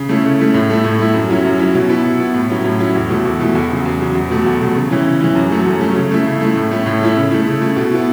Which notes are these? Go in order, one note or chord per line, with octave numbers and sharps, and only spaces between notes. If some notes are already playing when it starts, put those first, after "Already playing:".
Already playing: C#3
A3 C#4 E4
C#3
A3 C#4 E4
A2
A3 E4
A2
A3 E4
F#2
F#3 C#4 E4
F#2
F#3 C#4 E4
B2
B3 E4
B2
B3 E4
A2
F#3 C#4 E4
A2
F#3 C#4 E4
E2
B2 A3 E4
E2
B2 A3 E4
E2
C#3 F#3
E2
C#3 F#3
E2
B2 F#3 A3
E2
B2 F#3 A3
C#3
E3 C#4 E4
C#3
E3 C#4 E4
F#2
F#3 A3 C#4
F#2
F#3 A3 C#4
C#3
A3 E4
C#3
A3 E4
A2
A3 C#4 E4
A2
A3 C#4 E4
C#3
A3 E4
C#3
A3 E4
B2
B3 E4